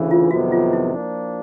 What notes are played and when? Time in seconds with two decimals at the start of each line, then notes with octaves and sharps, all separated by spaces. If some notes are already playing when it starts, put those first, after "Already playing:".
Already playing: D2 C#3 E3
0.11 F4
0.31 F2 C3 D#3 F#3 B3 F#4
0.52 F4
0.73 E4
0.93 F3 A#3 D4